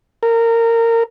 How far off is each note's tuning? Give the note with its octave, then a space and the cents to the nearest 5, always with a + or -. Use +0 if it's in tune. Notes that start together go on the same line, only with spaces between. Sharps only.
A#4 -20